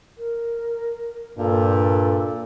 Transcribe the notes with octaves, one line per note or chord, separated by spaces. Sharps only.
A#4
G2 A#2 A4